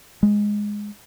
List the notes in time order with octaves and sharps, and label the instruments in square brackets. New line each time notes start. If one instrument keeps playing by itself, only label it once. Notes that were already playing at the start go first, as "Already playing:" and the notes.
[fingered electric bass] G#3